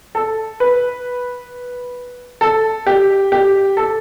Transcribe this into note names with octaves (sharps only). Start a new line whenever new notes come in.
A4
B4
A4
G4
G4
A4